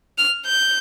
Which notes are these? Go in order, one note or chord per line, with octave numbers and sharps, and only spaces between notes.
F6
G6